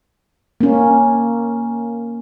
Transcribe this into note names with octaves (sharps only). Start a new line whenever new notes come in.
A#3 C#4